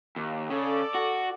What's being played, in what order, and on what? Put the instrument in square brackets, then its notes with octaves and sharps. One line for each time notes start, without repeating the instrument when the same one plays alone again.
[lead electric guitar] D#2
[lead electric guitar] C#3 [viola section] A4 D5
[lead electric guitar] F#4